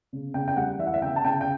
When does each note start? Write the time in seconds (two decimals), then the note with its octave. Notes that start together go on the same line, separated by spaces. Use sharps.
0.13 C#3
0.34 C#3 G5
0.48 G5
0.56 G3 F#5
0.79 E3 E5
0.87 F#5
0.94 E5
1.02 C#3 G5
1.16 A5
1.24 C#3 G5
1.41 G5